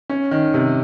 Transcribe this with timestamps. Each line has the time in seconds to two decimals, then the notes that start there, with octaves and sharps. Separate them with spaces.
0.10 C#4
0.31 D#3
0.54 C3